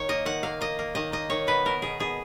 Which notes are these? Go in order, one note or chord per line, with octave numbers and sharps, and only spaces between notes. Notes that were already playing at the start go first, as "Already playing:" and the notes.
Already playing: D#3 C#5
A#3 D#5
D#3 F#5
A#3 F5
A#3 D#5
A#3
D#3 D#5
A#3 D#5
D#3 C#5
B2 B4
B2 A#4
B2 G#4
B2 G#4